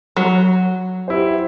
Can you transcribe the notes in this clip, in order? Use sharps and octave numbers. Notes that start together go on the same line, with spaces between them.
F#3
E4 G4 C5